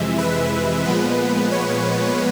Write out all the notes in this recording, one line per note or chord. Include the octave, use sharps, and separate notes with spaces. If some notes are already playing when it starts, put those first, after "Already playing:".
Already playing: F2 C3 E3 G#3 E5
B4
A#2 F3 G#3 B3
C#5